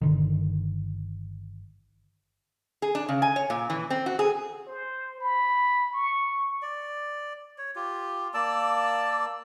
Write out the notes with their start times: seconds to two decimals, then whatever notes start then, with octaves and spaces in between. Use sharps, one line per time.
0.01 G1 D3 D#3
2.82 G#4
2.95 D4
3.09 C#3
3.22 G#5
3.36 C#5
3.50 A#2
3.70 E3
3.90 C4
4.06 F#4
4.19 G#4
4.67 C5
5.21 B5
5.93 C#6
6.62 D5
7.58 C#5
7.75 F4 G4
8.34 A#3 D5 A5 E6